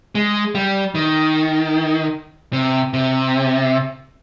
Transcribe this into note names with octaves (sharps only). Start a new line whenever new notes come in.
G#3
G3
D#3
C3
C3